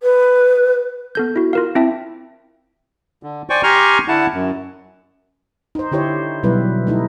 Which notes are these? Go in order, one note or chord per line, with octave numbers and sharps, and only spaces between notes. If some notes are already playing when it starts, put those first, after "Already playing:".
B4
B3 A4 G6
E4 F#4
F4 A#4 F5
C4 E4 E5 G5 A5
D3
C5 D5 G5 G#5 C#6
G4 G#5 A#5 C6 C#6 F6
D3 E4 F#5 A5
F#2
D#4 C5
D3 E4 G4 C5 C#5
B2 F#3 G3 E4 B4
A3 D#4 E4